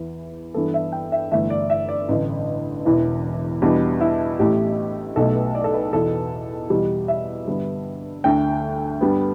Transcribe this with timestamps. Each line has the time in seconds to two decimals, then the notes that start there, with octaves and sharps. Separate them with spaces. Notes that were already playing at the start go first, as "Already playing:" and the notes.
Already playing: E2 E3 B3
0.54 G2 E3 B3 A4
0.74 E5
0.92 G5
1.12 E5
1.32 G1 G2 E3 A3 E5
1.50 D5
1.70 E5
1.89 D5
2.09 A1 G2 D3 B4
2.85 E1 E2 E3
3.62 E2 B2 G3 B3 D4
4.01 E4
4.39 A1 A2 A3 G4
5.16 B1 B2 A3 A4
5.35 B4
5.55 D5
5.64 A4
5.74 B4
5.93 E2 B2 B3 A4
6.70 E2 B2 G3 B3 G4
7.08 E5
7.47 G2 D3 G3 B3
8.24 D2 D3 A3 G5
9.01 G2 G3 B3